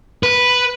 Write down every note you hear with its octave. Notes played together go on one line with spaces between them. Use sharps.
B4